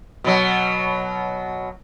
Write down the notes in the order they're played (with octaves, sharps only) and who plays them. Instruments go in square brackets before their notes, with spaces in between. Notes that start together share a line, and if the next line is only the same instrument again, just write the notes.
[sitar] B2 F#3